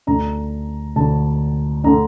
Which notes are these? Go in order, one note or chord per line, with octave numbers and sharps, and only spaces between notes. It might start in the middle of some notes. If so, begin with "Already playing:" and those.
D2 D3 A3 D4 A#5
D2 D3 A3 D4 A5
D3 A3 D4 A#5